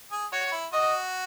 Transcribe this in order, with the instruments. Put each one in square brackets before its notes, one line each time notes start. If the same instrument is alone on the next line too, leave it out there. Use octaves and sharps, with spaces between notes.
[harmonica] G#4
[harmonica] F#4 [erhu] C#5
[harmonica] F#4
E4
[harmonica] F#4 [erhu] D#5